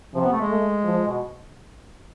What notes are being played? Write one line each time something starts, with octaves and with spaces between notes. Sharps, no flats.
C3 F3
B3
A3
G#3
A3
F3
B2